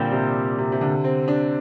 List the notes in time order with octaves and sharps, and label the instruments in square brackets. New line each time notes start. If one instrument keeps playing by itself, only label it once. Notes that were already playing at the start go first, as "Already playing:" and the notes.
Already playing: [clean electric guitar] A#2 G3 C4 G4 [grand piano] D3
[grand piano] C3
C3
C3
D3
C4
D4